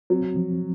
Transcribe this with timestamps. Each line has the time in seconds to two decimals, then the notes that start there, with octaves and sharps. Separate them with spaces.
0.10 F#3 C4
0.36 F3